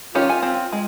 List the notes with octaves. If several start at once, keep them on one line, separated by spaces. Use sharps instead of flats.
D#3 C#4 F4 G4
G#5
C4
G#3